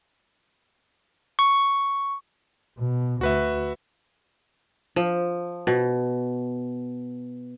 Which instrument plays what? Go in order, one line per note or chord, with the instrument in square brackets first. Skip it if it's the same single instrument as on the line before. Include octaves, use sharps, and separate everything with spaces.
[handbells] C#6
[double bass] B2
[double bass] D2 [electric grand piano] F#4 B4 E5
[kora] F3
B2